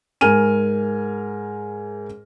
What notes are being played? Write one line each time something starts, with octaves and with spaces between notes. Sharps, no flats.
G#2 A#4 G#5 F6 D#7